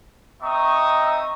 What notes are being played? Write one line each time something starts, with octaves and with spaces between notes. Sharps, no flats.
C4 D#4 D#5 E5 C#6 D#6